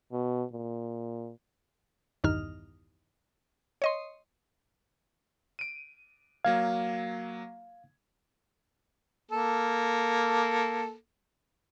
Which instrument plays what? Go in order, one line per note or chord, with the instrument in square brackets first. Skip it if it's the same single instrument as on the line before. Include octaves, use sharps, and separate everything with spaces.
[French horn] B2
A#2
[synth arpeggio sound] B1 E2 G2 D#3 D#4 F6
C#5 D#5 C6
[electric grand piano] D7 D#7
[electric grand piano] F#3 A#3 G#6 [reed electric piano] F5
[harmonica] A#3 A4